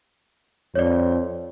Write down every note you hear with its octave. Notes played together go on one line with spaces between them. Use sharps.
F2 C#5 D5